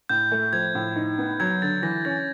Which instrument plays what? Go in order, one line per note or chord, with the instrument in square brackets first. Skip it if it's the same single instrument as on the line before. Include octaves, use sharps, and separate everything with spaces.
[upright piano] A2 [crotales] G6
[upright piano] A3
[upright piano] F3 [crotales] G#6
[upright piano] A2
D#4
B3
[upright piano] F#3 [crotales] G#6
[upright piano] D3 [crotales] A6
[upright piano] E3 [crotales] A#6
[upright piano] C#4 [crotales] A6